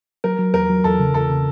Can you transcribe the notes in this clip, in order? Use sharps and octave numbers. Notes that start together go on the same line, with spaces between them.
F#3 A#4
F#3
E2 A#4
F#3
E2 A4
C#3
E2 A4
C#3